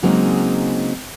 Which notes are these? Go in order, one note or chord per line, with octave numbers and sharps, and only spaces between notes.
C#3 F#3 G#3 A#3 C4 D#4